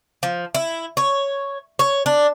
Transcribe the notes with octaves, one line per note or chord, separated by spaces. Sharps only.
F3
E4
C#5
C#5
D4